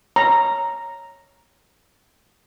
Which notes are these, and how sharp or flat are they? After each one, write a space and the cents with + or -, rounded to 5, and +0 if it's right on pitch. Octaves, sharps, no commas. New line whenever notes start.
C#5 +0 A#5 +0